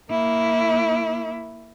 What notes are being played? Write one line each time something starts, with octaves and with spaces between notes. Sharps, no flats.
A#3 E4